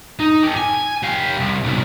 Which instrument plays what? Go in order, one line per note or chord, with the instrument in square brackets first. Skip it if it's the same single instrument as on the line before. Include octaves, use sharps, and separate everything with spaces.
[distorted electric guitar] D#4
G4 A4
G#5
G4 F5
C2
B1 A#2